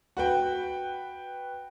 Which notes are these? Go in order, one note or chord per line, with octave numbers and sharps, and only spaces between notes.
F#4 B4 G5